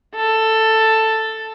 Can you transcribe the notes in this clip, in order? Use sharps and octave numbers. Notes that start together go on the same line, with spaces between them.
A4